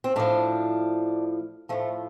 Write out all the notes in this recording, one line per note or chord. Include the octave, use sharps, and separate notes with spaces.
C4
A2 F3 D4
A2 F3 A3